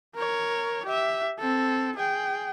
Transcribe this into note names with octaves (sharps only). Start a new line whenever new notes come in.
A#4 C#5
G4 E5
C4 A4
G#4 G5